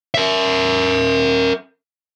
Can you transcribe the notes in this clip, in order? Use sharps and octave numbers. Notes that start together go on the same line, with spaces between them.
A#4 E5